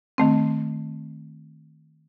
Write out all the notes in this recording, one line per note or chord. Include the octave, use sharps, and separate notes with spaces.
D#3 A3 C4